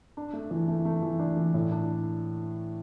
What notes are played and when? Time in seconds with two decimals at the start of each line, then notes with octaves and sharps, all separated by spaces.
0.17 D4
0.33 A3
0.51 E3
0.68 A3
0.85 A3
1.02 E3
1.19 D4
1.37 E3
1.54 A2
1.72 D4